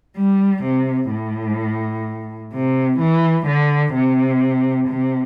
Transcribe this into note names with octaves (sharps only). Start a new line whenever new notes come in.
G3
C3
A2
C3
E3
D3
C3
C3